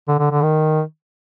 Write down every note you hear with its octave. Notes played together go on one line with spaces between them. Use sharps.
D3
D3
D3
D#3